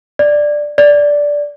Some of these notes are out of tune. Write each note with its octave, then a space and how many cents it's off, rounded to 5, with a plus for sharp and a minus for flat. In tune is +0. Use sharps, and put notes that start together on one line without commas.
D5 +10
D5 -5